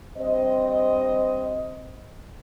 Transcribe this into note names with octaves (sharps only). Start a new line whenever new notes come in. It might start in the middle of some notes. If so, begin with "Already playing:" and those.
G2 C4 C5 D#5